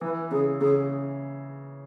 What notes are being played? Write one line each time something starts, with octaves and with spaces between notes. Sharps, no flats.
E3 B4
C#3 G#4
C#3 G#4